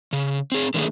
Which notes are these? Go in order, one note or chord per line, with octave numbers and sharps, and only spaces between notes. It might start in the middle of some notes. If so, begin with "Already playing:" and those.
C#3
C4 G#4
D3 D#3 A3 A#3 G#4